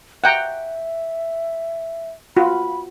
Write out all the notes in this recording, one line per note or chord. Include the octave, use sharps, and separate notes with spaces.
E5 F#5 G5 A#5
F4 F#4 B5